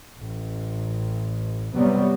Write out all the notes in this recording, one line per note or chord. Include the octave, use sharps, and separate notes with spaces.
A1
C3 F#3 G3 B3